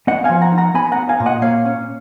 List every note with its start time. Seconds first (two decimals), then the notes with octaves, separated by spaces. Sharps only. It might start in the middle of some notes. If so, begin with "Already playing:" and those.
0.07 B3 D#5 F#5
0.24 F5 G#5
0.29 F3
0.41 F#5 A#5
0.52 D#4
0.58 F#5 A#5
0.74 B3 G#5 B5
0.92 F#5 A#5
0.97 B3
1.09 F5 G#5
1.20 A#2
1.26 D#5 F#5
1.42 A#3 C#5 F5
1.65 C#4